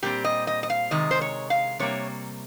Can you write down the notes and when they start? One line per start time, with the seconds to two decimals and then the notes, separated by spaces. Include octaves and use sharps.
0.03 A#2 G3 C4 G4
0.24 D#5
0.47 D#5
0.63 D#5
0.70 F5
0.91 C3 D#3 G#3 D#5
1.11 C5
1.21 C#5
1.50 F5
1.79 C3 G3 A#3 C#5